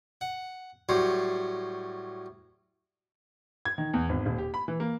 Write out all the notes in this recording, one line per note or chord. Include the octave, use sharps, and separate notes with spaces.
F#5
A2 F#3 G3 C5
G#6
D#3
E2
G#1
D#1
G4
B5
E3
A#3